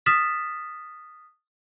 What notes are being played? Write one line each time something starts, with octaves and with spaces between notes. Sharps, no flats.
D#6 F6 A6 B6 E7